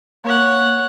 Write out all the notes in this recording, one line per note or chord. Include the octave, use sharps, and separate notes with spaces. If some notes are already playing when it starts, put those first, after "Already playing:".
A#3 C#5 F#5